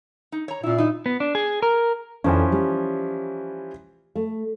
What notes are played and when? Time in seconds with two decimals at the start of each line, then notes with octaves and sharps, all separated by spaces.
0.32 D#4
0.48 C#5 A#5
0.63 A#2 C#4 E4
0.78 D#4 E4
1.06 B3
1.20 D4
1.35 G#4
1.62 A#4
2.24 F2 E3 F3 C#4 D4
2.52 G3
4.16 A3